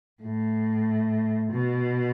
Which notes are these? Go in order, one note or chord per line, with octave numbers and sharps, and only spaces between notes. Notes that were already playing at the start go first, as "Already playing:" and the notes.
A2
B2